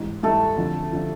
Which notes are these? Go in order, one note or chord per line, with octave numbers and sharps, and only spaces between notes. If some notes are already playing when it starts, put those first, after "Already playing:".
Already playing: G#2 E3 G3
G#2 E3 G3 A3 A4
F2 D3 F3
D3 F3